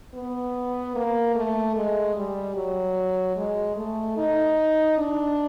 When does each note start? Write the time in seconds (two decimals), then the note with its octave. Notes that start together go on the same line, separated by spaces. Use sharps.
0.14 B3
0.95 A#3
1.35 A3
1.76 G#3
2.16 G3
2.55 F#3
3.36 G#3
3.76 A3
4.17 D#4
4.98 D4